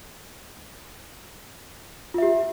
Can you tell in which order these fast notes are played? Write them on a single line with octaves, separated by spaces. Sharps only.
F4 E5 G4